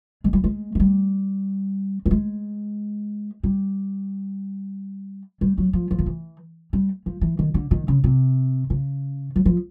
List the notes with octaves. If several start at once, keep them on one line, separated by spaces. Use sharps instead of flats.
G#3
G3
G#3
G#3
G3
G3
G#3
G3
G3
F#3
F3
F3
D#3
E3
G3
F3
E3
D#3
D3
D#3
C#3
C3
C#3
F#3
F3